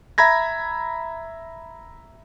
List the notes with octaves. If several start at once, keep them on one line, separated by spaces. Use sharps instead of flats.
E5 A#5 B5 G#6 A#6